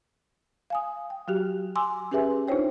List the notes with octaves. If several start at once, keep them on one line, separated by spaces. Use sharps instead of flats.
F5 G#5 D#6
G5
F#3 F#4 G4
G#5 C6 D6 E6
C#4 G4 G#4 B4 E5 G#5
D4 D#4 F4 C5 C#5 G5